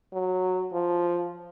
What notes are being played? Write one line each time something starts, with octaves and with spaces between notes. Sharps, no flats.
F#3
F3